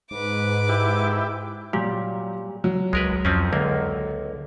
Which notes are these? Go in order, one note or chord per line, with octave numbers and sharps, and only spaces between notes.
G#2 B4 D6
E4 G4
A#2 F#3 G3 G4
F#3
C#2 G#3 A#4 B4
F2 F3 C4 C#4
C#2 D3 A#3